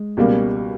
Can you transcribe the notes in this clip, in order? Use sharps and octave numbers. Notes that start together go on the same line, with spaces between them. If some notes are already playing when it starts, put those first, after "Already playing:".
Already playing: G#3
C#2 B2 G3 A#3